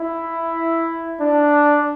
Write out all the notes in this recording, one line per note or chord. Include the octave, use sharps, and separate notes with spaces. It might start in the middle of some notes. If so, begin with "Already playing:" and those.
Already playing: E4
D4